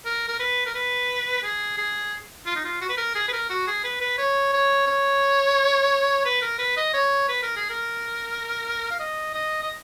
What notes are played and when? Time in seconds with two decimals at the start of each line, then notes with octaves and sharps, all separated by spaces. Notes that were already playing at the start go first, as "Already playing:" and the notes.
0.05 A#4
0.28 A#4
0.39 B4
0.66 A#4
0.74 B4
1.43 G#4
1.78 G#4
2.46 F4
2.55 D#4
2.64 F4
2.81 F#4
2.89 B4
2.97 A#4
3.15 G#4
3.28 B4
3.33 A#4
3.49 F#4
3.67 G#4
3.84 B4
4.01 B4
4.18 C#5
4.53 C#5
4.86 C#5
6.25 B4
6.42 A#4
6.59 B4
6.77 D#5
6.94 C#5
7.28 B4
7.42 A#4
7.56 G#4
7.70 A#4
8.90 F5
8.99 D#5
9.34 D#5
9.62 D#5